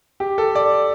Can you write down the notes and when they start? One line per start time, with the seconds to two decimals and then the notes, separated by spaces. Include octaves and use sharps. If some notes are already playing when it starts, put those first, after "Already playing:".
0.20 G4
0.38 A4
0.55 D5